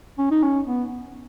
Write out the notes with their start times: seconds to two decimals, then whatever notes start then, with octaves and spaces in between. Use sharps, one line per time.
0.18 C#4
0.31 D#4
0.43 C#4
0.66 B3